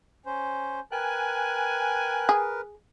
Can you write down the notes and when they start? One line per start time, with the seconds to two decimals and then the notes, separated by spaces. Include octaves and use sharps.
0.26 C#4 C5
0.92 A#4 B4 G5 G#5 F#6
2.29 G#4